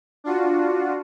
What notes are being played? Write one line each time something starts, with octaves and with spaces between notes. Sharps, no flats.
D4 F4 F#4